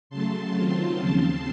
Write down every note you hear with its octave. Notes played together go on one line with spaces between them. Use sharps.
C#3 F#3 A3 A5 C6
D#3 F#3 C4 F4 A5 C6
D#2 C#3 F3 C4 A5 C6